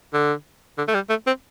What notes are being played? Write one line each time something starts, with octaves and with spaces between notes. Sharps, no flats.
D3
D3
A3
G3
A3
C4